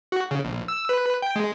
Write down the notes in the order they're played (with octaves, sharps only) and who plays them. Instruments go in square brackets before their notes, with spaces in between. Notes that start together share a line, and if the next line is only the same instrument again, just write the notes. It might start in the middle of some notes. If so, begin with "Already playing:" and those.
[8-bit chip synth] F#4
C#3
A#1
E6
B4
G5
G#3